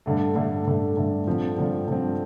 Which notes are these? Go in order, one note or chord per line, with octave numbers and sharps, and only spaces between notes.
G2 D3 A3
G2 D3 A3
G2 D3 A3
G2 D3 A3
G2 D3 F3 C4
G2 D3 F3 C4
G2 D3 F3 C4